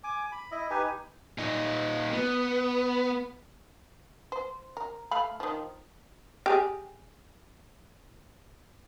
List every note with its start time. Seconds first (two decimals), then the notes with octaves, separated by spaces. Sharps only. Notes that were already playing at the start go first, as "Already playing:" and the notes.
0.04 G#5 D6
0.32 B5
0.51 E4 D#5 E5
0.70 D#4 G4 B4 G#5
1.38 A#2 D#4
2.13 B3
4.32 C5
4.77 A#4
5.11 A3 F5 B5
5.40 D#3 F3
6.46 G4 G#4